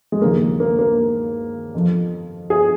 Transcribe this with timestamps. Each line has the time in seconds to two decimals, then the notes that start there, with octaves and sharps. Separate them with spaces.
0.12 G#3
0.22 D#2 C#3 F3 A#3
0.60 A#3
0.79 A#3
1.74 F2 F3
2.50 G#4